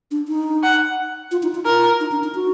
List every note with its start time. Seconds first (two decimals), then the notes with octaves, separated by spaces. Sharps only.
0.11 D4
0.28 D#4
0.63 F#5
1.31 F4
1.43 D#4
1.55 F4
1.66 F4 A#4
2.00 D#4
2.12 D4
2.24 D#4
2.35 F#4